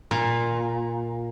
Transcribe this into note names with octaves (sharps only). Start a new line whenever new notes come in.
A#2